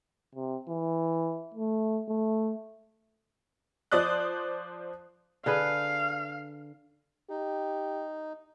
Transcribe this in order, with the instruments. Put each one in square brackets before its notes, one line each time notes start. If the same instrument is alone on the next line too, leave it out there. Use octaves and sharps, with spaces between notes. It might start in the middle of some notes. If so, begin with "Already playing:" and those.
[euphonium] C3
E3
A3
A3
[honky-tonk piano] F3 C5 D5 D#6 F#6
[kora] D3 G#4 B4 [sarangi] F5
[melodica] D#4 [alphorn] G4